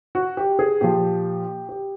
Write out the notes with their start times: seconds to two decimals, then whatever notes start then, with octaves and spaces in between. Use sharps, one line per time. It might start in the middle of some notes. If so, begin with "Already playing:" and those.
0.15 F#4
0.37 G4
0.59 G#4
0.81 A#2 F3 G4
1.69 G4